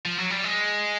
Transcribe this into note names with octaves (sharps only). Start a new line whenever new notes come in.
F3
F#3
G3
G#3